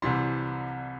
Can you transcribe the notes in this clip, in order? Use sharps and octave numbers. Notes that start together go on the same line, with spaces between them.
C2 C3 E3 G3 C6